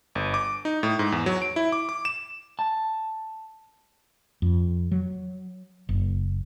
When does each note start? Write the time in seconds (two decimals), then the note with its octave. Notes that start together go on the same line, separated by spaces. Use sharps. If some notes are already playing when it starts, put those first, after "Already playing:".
0.15 G1
0.34 D6
0.65 D#4
0.83 A2
0.99 G#2
1.12 E2
1.26 F#3
1.42 D7
1.56 E4
1.72 D6
1.89 D6
2.05 E7
2.59 A5
4.42 F2
4.92 F#3
5.89 F#1